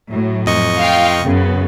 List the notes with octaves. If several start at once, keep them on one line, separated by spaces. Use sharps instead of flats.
A2 F#3
F2 D#5 C#6
F4 F5 G5
F#2 C#3 B3